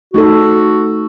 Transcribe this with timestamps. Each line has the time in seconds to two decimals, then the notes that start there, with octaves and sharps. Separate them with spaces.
0.13 A3 D#4 F#4 A4